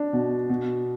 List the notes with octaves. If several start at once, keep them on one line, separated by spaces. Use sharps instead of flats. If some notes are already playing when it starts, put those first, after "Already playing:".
Already playing: D4
B2
B2